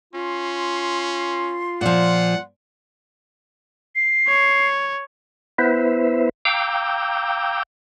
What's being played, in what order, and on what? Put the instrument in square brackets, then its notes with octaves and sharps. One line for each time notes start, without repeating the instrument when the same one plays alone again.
[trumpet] C#4 [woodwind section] F4 C6
[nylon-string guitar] A#2 F3 [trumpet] F#5
[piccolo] C7
[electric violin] C#5
[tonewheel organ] B3 E4 B4 C5 E5
F5 G5 A#5 D6 E6 G6